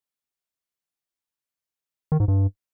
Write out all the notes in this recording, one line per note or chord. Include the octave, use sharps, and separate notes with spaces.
D#3
G#2
G2